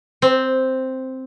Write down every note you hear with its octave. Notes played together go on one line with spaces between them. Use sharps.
C4